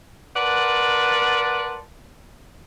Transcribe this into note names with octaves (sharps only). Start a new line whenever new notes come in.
A#4 B4 D5 F#5 A5 C6